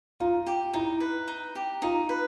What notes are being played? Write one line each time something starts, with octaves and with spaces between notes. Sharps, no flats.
D#4 F4
G4
D#4 E4
B4
D#4
G4
D#4 F4
B4